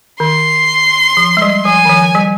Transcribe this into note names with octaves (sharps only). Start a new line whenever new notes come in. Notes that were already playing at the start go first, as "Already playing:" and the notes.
D#3 C6
F3
G#3
G3
F3 G#5
D#3
F3
G3